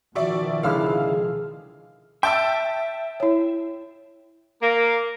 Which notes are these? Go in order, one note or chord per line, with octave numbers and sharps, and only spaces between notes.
B2 D#3 F3 F#4 D5 E5 C#6
C#2 D3 E4 G#4 F5 E6 F6
E5 G5 A5 E6
E4 C#5
A#3